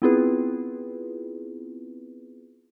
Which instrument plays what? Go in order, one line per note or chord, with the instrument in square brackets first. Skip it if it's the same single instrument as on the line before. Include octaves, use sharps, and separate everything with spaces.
[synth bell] B3 C4 E4 F4 G#4 B4